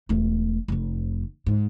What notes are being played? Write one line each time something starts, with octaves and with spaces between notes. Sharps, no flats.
E1 A3
F1 F2
G#2